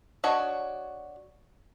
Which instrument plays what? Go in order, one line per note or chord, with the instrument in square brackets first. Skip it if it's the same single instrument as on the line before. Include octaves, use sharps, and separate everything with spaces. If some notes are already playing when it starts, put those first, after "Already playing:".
[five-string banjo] D4 F#4 C#5 D#5